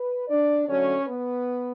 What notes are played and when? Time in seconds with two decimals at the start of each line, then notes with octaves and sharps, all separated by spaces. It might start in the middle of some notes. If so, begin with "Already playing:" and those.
Already playing: B4
0.28 D4 D5
0.67 D3 F#3 A3 C#4 C#5
1.06 B3 B4